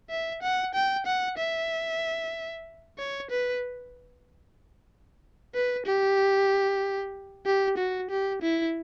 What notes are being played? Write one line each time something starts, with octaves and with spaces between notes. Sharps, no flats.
E5
F#5
G5
F#5
E5
C#5
B4
B4
G4
G4
F#4
G4
E4